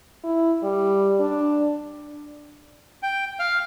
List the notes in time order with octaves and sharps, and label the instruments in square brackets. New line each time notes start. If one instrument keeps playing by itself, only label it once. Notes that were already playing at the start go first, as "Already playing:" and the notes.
[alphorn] E4
G3
D4
[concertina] G5
F5